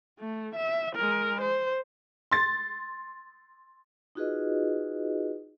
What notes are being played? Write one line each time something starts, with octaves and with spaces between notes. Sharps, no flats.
A3
E5
G#3 A#4
C5
C6 A6
D#4 F4 F#4 G#4 B4 D#5